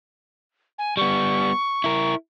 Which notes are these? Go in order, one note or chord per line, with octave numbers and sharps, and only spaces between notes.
G#5
G3 B3 C#6
E4 A#4